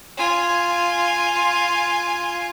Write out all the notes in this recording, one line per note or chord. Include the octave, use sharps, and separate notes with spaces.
F4 G#5